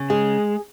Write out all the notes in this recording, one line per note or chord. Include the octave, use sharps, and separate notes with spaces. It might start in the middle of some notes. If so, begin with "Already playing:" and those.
Already playing: C#3
G#3 G#4